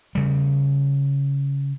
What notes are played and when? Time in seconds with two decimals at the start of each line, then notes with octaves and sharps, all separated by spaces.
0.15 C#3 G3